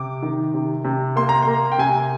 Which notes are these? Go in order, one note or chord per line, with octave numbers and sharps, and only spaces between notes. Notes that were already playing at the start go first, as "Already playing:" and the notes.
Already playing: C3 D6
D#3
C3
C3
A#3 C6
A#5
C6
A#3
G5
C3 G#5